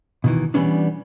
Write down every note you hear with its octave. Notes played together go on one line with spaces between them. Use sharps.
B2 D#3 E3
E3 F#3 G3 B3 C#4 D4